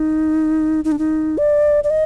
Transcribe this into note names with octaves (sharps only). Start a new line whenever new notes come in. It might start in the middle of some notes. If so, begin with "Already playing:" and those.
Already playing: D#4
D#4
D4
D#4
D5
D5
D#5